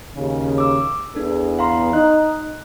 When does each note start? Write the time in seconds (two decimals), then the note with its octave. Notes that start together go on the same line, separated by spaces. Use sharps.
0.15 D#2 C#3
0.58 D6 E6
1.15 E2 D4 A4
1.59 F5 A#5 C6
1.93 D#4 F#6